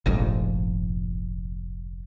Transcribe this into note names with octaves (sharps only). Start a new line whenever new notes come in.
F1 A#1 F2 G#2